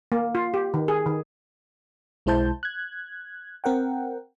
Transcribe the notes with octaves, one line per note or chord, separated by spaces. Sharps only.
A#3
F4
G4
D#3
G#4
D#3
B1 G#3 E4 C5 A5 G6
F#6 G#6
C4 A#4 F#5 G5